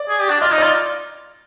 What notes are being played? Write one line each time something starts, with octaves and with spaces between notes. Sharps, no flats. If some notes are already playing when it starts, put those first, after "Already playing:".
Already playing: D5
G#4
G4
D4
F4 D#5
D#4
F4 D5